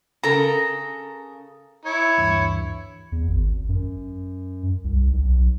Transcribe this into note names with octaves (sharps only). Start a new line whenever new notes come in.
C#3 A4 A#4 A#5
E4 C#5
D2 G2 E3
E2
G#1
F#2
C2
B1